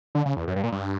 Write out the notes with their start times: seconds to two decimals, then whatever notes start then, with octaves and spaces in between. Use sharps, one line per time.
0.15 D3
0.26 C#3
0.37 E2
0.48 F#2
0.56 G2
0.63 A#2
0.72 G2